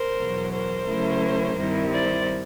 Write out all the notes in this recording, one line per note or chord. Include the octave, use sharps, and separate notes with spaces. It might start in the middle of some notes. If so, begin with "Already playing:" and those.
Already playing: A#4 C5
E2 B2 F#3
A#4 C5
C#3 F#3 A3 C#4 E4
G2 D#3 G3 C4 E4
C5 D5